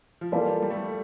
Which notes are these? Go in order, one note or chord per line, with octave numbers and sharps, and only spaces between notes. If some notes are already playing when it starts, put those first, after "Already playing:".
F3
E3 G3 A#3 F4 A4 D5
G3
A3
G3